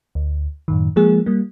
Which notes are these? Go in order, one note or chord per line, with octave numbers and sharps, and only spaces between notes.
D2
F#2 A2 D#3
F3 G#3 A#3 G#4
G3 A#3